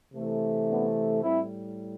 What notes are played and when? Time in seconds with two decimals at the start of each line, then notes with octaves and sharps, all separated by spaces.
0.14 C3 E3 A3
0.69 B3 D4
1.23 A2 G3 C4 E4